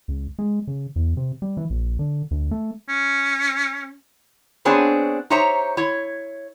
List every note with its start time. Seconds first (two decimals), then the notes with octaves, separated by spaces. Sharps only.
0.08 C#2
0.39 G#3
0.67 C#3
0.96 E2
1.17 C3
1.42 G3
1.57 E3
1.70 A#1
1.99 D3
2.31 D2
2.51 A3
2.89 C#4
4.65 B3 C4 D4 G#4 C#5
5.30 D#4 G4 C5 C#5 E5 A#5
5.77 E4 C#5